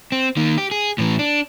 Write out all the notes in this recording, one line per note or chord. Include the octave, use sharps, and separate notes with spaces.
C4
D#3 A#3
G4
G#4
A2 E3
D4